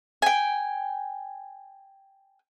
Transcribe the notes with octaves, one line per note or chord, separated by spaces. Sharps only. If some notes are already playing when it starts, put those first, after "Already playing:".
G5 G#5